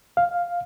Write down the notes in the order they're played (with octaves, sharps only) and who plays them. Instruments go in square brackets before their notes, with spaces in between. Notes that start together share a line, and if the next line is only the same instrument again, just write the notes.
[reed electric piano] F5